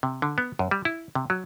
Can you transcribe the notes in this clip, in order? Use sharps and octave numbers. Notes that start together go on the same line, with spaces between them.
C3
D3
B3
F#2
G3
E4
C3
F#3